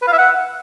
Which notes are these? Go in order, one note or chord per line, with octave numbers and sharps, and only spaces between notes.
B4
F5
E5
F#5